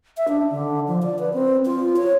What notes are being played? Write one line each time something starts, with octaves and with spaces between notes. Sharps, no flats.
E5
D4
D3
F3
D5
B4
C4
F4
C#5